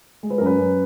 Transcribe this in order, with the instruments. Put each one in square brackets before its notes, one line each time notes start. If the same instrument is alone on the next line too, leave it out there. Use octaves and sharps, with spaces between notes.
[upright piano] G#3
[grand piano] B4
A#4
[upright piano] F#2
[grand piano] B4
[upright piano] F#2